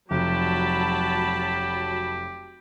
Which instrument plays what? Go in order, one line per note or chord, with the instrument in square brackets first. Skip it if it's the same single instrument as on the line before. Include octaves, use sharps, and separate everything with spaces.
[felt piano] F1 [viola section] F#3 A5 B5 [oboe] G4